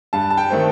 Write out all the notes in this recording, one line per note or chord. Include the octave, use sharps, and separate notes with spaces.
G2 A5
A5
G5
D#3 A3 C4